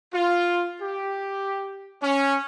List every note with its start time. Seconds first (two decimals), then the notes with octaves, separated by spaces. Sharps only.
0.14 F4
0.82 G4
2.03 C#4